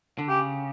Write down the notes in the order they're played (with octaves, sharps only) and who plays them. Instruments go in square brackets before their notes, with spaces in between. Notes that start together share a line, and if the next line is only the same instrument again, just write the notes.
[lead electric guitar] D3
[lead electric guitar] C#3 [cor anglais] G4